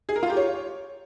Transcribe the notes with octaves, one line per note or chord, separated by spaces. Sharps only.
G#4
A#4
F4
G4
C#5